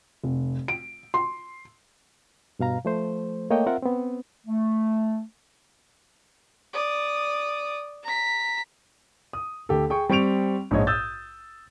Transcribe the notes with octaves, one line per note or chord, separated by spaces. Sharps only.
F1
D7
C6
G2 B2 F5 A#5
F3 A3 C5
A3 A#3 C#5 D#5 G5
C4 F4 A#4 E5 F#5
B3 C4
A3
D5 D#6
A#5 B6
D#6
D2 G4 A4
G#4 G5 C#6
G3 C4 C#6 D7 F7
A#1 G#2 C#5 D#5
D#6 E6 G6 A6